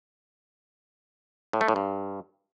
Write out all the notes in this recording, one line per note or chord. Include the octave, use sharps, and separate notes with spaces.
A2
A3
A2
G2